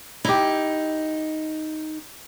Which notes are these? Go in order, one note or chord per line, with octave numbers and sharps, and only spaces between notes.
D#4 E4 G4